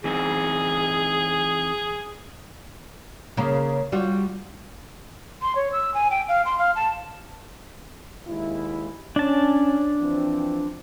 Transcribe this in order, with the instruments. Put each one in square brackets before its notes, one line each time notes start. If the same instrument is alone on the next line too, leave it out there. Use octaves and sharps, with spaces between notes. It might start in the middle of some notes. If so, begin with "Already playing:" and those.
[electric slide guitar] E3 C4 D#4 [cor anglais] G#4
[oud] C#3 A#3
G3 F4 F#4
[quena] C6
C#5
E6
G#5
G5
F5
C6
F5
A5
[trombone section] D#2 G#3 E4
[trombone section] C#4 [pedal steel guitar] D4 A5
[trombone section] E3 F3 C4